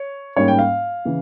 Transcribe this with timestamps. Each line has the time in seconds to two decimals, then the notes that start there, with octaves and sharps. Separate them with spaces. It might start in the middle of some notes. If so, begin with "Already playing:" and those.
Already playing: C#5
0.36 G#2 G3 A#3 C#4 C#5
0.48 G5
0.59 F5
1.05 C#3 E3